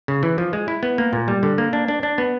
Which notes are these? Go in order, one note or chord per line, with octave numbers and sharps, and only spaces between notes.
C#3
E3
F3
G#3
E4
B3
A#3
A#2
G3
D3
A#3
D4
D4
D4
B3